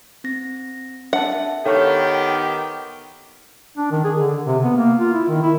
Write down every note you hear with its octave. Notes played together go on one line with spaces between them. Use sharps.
C4 A#6
D4 E5 F#5 A5
D#3 B3 G4 A4 C#5 F5 G5 C#6
D4
D#3
G#4
D3
C3
B3
A#3
F4
E4
D#3
E4